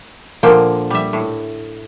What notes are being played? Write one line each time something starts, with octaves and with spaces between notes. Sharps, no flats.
A#2 D3 F3 A#3 G5
G3 E5
A2